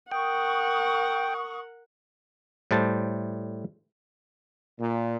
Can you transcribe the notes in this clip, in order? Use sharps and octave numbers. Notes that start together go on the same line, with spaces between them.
A#4 F#5 G5 C#6 D#6
A2 G3 C5 A5
A#2